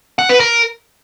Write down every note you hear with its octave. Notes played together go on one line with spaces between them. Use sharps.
F#5
B4
A#4